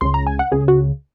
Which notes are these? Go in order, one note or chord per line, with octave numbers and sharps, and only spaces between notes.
C#2 C#3 C6
A#5
G#5
F#5
C#2 C#3 G#4
F#4